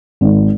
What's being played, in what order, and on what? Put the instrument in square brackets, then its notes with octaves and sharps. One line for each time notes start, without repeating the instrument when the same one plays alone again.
[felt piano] G#1